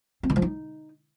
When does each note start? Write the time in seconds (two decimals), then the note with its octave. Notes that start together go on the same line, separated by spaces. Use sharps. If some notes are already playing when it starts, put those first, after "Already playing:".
0.23 C4
0.30 D#3
0.36 F3
0.42 D#4